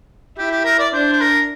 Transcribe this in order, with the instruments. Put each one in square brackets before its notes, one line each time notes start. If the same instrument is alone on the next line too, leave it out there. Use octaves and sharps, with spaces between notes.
[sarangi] E4 [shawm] G4
[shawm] G4
A#4
D5
[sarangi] D4 [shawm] C5
[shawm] C5
A#4